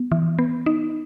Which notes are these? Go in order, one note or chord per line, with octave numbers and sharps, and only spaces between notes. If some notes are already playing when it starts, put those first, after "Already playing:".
Already playing: B3
E3
B3
D#4